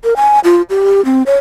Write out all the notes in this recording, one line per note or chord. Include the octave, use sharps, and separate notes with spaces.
A#4
G#5
F4
G4
C4
C#5